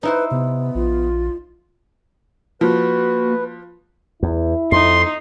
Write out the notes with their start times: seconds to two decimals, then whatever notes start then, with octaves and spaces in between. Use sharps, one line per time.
0.03 D#4 E4 B4 C5
0.31 C3 B3
0.75 A#1 F4
2.61 F3 A#3 F#4 B4
4.23 E2 E4
4.72 F2 D#4 C6